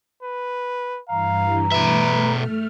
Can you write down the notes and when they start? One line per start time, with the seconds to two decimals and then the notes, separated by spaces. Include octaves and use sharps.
0.23 B4
1.09 G2 E3 F5 A#5
1.72 B2 A3 B4 E5 F6